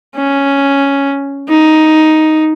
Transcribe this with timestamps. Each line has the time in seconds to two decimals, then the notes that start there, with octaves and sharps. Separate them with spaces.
0.16 C#4
1.49 D#4